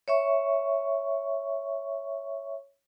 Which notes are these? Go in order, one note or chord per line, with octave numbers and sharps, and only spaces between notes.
C#5 E5 C#6